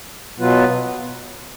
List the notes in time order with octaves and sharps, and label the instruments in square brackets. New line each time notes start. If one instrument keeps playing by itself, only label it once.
[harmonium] B2 F#3 B3 F4 B4